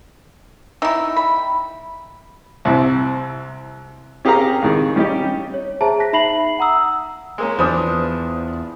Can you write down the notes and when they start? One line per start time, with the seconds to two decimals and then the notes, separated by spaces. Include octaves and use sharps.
0.82 D#4 E4 E6
1.16 B5
2.65 C2 C3 E4
4.25 C#4 G4 G#4 A#4 F5 A#5
4.62 C#2 D#3 G#4
4.96 G3 C#4 D#4 G4
5.54 C#5
5.81 G#4 C5 E5 A5 A#5
6.00 F#6 A#6 B6
6.13 D#4 E5 B5 C7 F#7
6.59 F#5 A#5 D#6 E6
7.38 G#3 A#3 C#4
7.59 E2 F3 D4 B4 C5 D#6